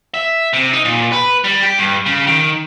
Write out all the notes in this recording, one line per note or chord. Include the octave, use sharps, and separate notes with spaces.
E5
C3
D#4
A#2
B4
G3
G4
G2
C#3
D#3